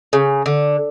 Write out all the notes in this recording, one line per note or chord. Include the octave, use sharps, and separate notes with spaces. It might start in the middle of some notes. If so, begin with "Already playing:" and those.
C#3
D3